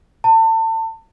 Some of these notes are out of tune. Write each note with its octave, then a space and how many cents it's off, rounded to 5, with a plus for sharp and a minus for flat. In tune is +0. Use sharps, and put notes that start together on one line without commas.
A5 +35